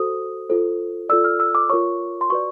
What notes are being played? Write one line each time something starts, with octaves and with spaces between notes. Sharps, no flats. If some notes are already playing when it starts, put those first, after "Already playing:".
Already playing: F#4 A4 C5 D#6
F4 A4 C5
F4 A4 D5 E6
F6
E6
D6
F4 A#4 C#5 C#6
C6
F#4 B4 D5 C#6